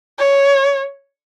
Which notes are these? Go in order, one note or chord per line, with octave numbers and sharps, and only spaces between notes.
C#5